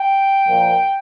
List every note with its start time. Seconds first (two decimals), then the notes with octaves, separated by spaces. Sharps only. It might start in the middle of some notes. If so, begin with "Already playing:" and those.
Already playing: G5
0.47 A#2 F3 A#3